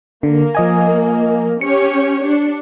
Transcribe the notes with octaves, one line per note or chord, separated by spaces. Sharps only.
D3 A#3
F3 D#5 G#5
C#4 G4 C#5 C#7
D4